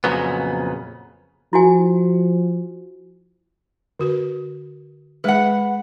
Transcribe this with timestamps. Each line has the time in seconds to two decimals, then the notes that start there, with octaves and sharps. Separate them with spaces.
0.04 F2 A#2 C#3 F#3 B3
1.53 F3 E4 F#4 G#5
3.99 D3 F#4 B4
5.24 G#3 G#4 B4 E5 F#5